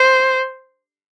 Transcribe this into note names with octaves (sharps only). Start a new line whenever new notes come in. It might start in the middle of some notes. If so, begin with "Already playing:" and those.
Already playing: C5